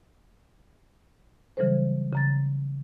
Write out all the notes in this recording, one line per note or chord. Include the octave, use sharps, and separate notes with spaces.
C#3 E3 F#3 G3 A4 C5
C#3 A#5 A6